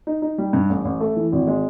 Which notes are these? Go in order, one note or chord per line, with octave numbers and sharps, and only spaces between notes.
D#4
D#4
G3
G2
A1
A1
A3
E3
G#1
G#3